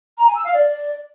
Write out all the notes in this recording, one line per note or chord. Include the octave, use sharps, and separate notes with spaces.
A#5
G#5
E6
F5
D5